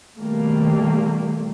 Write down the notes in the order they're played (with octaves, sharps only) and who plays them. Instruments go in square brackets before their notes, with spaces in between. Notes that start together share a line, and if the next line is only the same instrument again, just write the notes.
[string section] B2 D#3 G3 A3 A#3